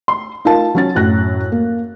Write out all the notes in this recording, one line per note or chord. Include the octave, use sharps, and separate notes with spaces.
C6
D#4 F4 A#4 F5 A5
F#3 C#4 A6
F#2 A2 F#4 F#6 A#6
A#3